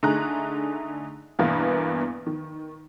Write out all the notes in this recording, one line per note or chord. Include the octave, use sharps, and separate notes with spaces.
D3 A3 D#4 G#4 A#5 F#6
E2 G2 B2 E3 A#3 B3
D#3